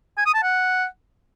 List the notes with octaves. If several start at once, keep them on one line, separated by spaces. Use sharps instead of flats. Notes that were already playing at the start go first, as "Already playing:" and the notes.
G#5
D#6
A5
F#5